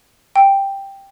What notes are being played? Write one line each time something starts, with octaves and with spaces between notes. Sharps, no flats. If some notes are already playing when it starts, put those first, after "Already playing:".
G5